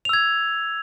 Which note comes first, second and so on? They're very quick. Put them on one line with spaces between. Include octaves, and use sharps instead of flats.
F7 E6 G#6